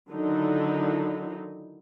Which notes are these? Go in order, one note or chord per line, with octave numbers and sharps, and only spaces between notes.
D3 D#3 F#3 D#4 E4